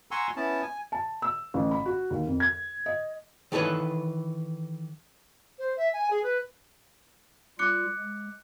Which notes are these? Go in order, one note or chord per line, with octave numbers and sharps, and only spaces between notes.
F#5 G#5 A#5 C6 C#6 E6
B3 C#4 E4 A5
G#5
A5
E6
A1
B5
F#4
D#2
F2
G#6
D#5
D#3 E3 A4 B4 C#5
C5
E5
G#5
G#4
B4
G3 F4 D6 F#6 C#7
G#3